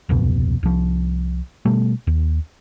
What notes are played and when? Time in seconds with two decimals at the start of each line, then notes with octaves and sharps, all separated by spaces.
0.09 D1 C2 F2 B2
0.63 C2 F3
1.65 B2 G3 A3
2.07 D#2